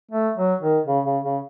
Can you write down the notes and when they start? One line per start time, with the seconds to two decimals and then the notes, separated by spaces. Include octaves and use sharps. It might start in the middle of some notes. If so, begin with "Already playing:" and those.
0.11 A3
0.37 F#3
0.61 D#3
0.87 C#3
1.05 C#3
1.24 C#3